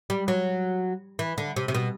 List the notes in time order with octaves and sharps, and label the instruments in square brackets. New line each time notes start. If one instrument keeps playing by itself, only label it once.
[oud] G3
F#3
E3
D3
C3
C3
B2